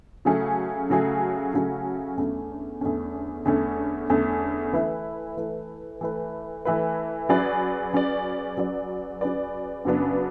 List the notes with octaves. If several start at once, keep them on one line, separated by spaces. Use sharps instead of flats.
C#3 F#3 A3 C#4 G#4
C#3 F#3 A3 C#4 G#4
C#3 F#3 A3 C#4 G#4
E2 D3 A3 C#4
E2 D3 A3 C#4
E2 D3 A3 C#4
E2 D3 A3 C#4
E3 A3 E4 B4
E3 A3 E4 B4
E3 A3 E4 B4
E3 A3 E4 B4
F#3 C#4 G#4 B4 D5
F#3 C#4 G#4 B4 D5
F#3 C#4 G#4 B4 D5
F#3 C#4 G#4 B4 D5
F#2 C#3 F#3 B3 D4